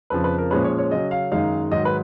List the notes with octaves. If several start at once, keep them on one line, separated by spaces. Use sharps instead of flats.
F2 C#3 F3 B4
B4
A#4
A#2 F3 G#3 C#4 B4
C#5
C#5
C#3 F#3 C#4 D#5
F5
F#2 D#3 G#3 D#4 F5
G#2 D#3 F#3 D#5
B4